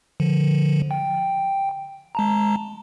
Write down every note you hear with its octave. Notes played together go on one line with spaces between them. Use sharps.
D3 F3
G5
G#3 A5 A#5